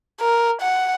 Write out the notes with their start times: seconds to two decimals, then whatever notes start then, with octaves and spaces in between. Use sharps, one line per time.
0.21 A#4
0.61 F#5